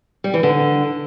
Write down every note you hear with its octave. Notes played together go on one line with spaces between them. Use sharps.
G3
E3
D3